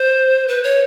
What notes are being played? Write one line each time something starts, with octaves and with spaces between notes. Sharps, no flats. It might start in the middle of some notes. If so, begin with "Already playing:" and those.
Already playing: C5
B4
C#5